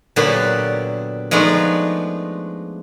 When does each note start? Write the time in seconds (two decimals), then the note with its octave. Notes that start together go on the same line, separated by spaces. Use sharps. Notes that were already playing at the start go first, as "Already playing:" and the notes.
0.16 A#2 D3 F#3 B3 G4 A5
1.31 F3 G#3 A3 B3 D4 D#4